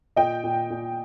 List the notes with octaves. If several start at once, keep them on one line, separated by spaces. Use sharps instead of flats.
A#2 D#5 G5
A#2
A#2